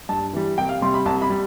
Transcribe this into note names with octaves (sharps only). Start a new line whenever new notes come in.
G2 A5
E3 G3
C2 G5
F5
C3 G3 C6
B5
C2 A5
B5
G3